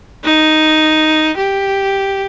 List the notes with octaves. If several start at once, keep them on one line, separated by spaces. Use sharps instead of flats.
D#4
G4